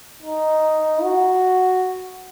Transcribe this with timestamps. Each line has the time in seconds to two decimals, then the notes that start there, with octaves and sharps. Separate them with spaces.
0.22 D#4
1.03 F#4